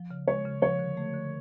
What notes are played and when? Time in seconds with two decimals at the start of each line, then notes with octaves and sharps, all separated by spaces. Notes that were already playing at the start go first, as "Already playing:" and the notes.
Already playing: F3
0.11 C#3
0.28 G#3 C#5
0.45 C#3
0.62 F3 C#5
0.79 D3
0.97 A3
1.14 D3